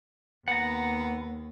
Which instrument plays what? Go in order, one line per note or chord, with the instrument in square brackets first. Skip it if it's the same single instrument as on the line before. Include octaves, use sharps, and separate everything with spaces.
[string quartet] D#2 [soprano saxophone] B3 [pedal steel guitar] F#5 A#5